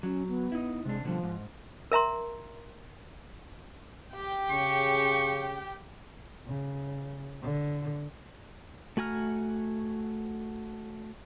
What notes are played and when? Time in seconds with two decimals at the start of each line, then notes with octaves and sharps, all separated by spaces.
0.03 F#3 C#4
0.28 B3
0.52 D#4 E4
0.85 C3 G#3 D4
1.04 B2 D3 F3 G3
1.23 G#2
1.92 A#4 E5 A#5 C6
4.15 G4 G5
4.50 C#3 C#6
6.47 C#3
7.42 D3
8.97 A3 F#4 G#5 A#5 F6